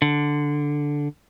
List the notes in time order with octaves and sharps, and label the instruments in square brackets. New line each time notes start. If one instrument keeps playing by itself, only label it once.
[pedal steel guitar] D3